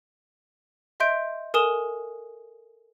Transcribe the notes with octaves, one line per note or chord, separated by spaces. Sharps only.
D#5 E5 C6 G6 D7
A4 A#4 G#5 D#6 E7 G7